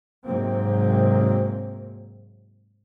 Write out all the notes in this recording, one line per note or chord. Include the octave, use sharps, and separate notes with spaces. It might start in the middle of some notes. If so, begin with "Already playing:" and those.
G#2 C3 F#3 A#3 C4